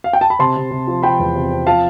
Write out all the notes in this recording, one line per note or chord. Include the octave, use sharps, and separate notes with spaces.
F5
G5
A5
B5
C3 A5 C6
C3
C3
F3
F3 G5 B5
E2
C3
C4
F3 F5 A5